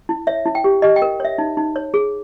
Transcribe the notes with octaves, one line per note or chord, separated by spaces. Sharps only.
E4
C#5 E5
E4
G5
G4
G4 D#5
G5
A#4
C#5 E5
D#4
D#4
C#5
G#4